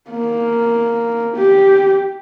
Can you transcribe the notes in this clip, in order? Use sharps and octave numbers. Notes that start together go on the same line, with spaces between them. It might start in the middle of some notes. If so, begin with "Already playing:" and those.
A#3
G4